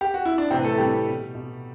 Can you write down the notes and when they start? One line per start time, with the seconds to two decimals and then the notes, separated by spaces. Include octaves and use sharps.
0.01 G4
0.14 F#4
0.25 E4
0.38 D4
0.50 A2 C3 E3 C4
0.60 B4
0.65 A3 A4
0.78 A2 E3 G3 G4
1.07 B2
1.35 B2